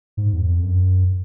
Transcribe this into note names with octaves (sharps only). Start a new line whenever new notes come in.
G#2
E2
F2
F#2